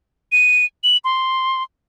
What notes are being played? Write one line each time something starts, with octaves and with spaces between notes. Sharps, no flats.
D#7
F#7
C6